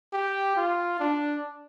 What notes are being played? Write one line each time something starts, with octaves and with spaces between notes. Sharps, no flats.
G4
F4
D4